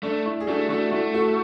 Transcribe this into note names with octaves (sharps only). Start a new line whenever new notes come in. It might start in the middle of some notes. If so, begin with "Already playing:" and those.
A3 D4
E4
G#4
A3 D4 F#4
A3 D4 F#4
A3 E4
F#4 A4